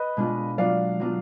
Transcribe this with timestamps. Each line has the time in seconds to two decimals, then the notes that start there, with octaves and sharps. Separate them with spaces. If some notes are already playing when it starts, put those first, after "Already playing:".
Already playing: B4 D#5
0.17 B2 G#3 D4 F4
0.58 F#3 B3 D4 F4 D5 F5
1.00 F#3 B3 D4 F4